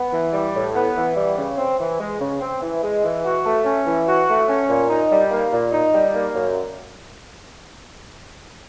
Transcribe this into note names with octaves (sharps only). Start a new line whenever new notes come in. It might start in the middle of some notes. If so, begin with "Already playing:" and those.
Already playing: B3
E3
G3
A2
B3
E3
G3
C#3
C4
E3
G#3
C#3
C4
E3
G#3
E3
F#4
A3
C#4
E3
F#4
A3
C#4
A#2
D#4
G3
A#3
A#2
D#4
G3
A#3
F#2